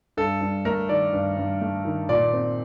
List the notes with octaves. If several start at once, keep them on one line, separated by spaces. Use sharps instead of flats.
G2 A4
G2
A3 A#4
D#3 D5
G2
G2
A3
D#3
A#2 D5
C4